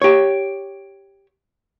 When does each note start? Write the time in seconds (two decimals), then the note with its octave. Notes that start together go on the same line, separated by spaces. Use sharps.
0.02 G4 C#5